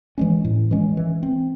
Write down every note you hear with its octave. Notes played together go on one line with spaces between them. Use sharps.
E3 G#3 C#4
A2
E3 G#3 C#4
E3
C4